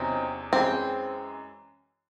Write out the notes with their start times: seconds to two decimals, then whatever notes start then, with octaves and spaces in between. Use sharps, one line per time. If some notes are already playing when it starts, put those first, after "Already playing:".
Already playing: E2 C3 F#3 C4 C#4 D#4 E4
0.52 F#2 E3 G#3 C4